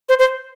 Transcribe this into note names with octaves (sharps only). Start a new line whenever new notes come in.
C5
C5